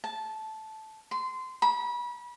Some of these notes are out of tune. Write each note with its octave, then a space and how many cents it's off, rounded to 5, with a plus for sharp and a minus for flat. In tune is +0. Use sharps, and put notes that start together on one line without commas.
A5 -10
C6 -20
B5 -30